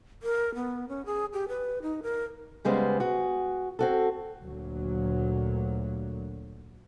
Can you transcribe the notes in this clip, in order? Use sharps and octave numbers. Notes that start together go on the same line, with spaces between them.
A#4
B3
C#4
G#4
G4
B4
D#4
A#4
C#3 G3 G#3 B3 C5
F#4 G#4
C4 F#4 A4
D2 A#2 F#3